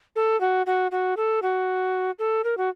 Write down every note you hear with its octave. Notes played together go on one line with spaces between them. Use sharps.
A4
F#4
F#4
F#4
A4
F#4
A4
A#4
F#4